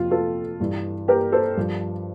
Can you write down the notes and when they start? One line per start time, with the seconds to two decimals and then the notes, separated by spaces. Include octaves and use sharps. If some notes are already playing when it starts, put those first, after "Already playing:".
Already playing: F2 C3 F3 F4
0.11 F4 A4
0.60 G2 E3
1.08 G4 A#4
1.32 A4 C5
1.57 G2 F3